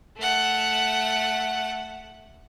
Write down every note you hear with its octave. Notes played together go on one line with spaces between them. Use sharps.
A3 F#5